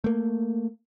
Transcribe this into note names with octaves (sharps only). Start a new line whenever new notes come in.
A3 A#3